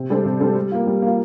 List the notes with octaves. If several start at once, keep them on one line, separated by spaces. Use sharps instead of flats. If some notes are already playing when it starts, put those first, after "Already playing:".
Already playing: C3
G3 D4 A4 C5
C3
G3 D4 A4 C5
G3
A#3 F4
G3
A#3 F4